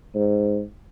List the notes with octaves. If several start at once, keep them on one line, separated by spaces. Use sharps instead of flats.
G#2